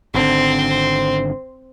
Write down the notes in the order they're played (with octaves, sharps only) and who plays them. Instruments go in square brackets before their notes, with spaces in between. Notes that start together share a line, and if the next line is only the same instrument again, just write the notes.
[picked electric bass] G#1 D3 [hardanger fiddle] C4 C5